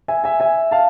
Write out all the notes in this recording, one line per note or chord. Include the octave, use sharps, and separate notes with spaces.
E5 G#5
E5 G#5
E5 G#5
F5 A5